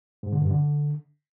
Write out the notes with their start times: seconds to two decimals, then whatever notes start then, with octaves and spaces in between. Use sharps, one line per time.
0.23 G#2
0.32 D3
0.42 G2
0.51 D3